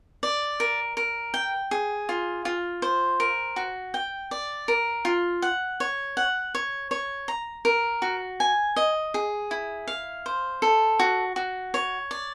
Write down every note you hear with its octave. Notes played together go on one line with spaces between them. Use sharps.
D5
A#4
A#4
G5
G#4
F4
F4
C5
A#4
F#4
G5
D5
A#4
F4
F#5
C#5
F#5
C#5
C#5
A#5
A#4
F#4
G#5
D#5
G#4
E4
F5
C5
A4
F#4
F#4
C#5
D5